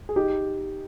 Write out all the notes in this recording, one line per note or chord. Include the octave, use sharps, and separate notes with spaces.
G#4
D#4 G4